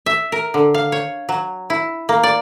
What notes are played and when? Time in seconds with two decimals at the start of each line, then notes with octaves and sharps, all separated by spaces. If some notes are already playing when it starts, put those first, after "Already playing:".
0.06 E5
0.32 A#4
0.54 D3
0.74 F5
0.92 C#5
1.29 F#3
1.70 E4
2.09 A#3
2.23 D5